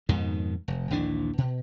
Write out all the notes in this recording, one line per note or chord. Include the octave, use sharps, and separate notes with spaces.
F2 G#2 B2 D#3
F1
A#1 D#2 E3 D4
B2